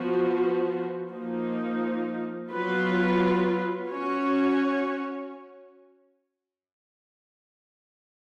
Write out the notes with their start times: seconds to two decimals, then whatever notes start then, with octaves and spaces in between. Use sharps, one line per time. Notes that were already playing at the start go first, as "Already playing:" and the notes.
Already playing: F3 B3 F#4
1.12 F3 A#3 D#4
2.50 F#3 B3 F4 B4
3.88 C#4 F#4 C#5